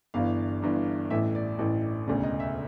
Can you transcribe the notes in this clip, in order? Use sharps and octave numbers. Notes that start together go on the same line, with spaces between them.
G1 G2 E3 F5
G1 G2 E3
A1 A2 E3 E5
D5
A1 A2 E3
E1 D2 C#3 D5
D#5
E5